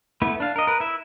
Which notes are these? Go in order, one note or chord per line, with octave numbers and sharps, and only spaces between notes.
A3 B3 E4
D4 F5
A#4 D#5
A#4 B4
E4 E5